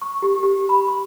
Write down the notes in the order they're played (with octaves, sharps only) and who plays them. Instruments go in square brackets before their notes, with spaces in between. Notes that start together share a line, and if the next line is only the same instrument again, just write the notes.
[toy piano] C#6
G4
G4
B5
C6